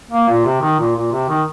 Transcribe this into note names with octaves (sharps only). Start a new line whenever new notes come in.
A#3
A#2
C3
D#3
A#2
A#2
C3
D#3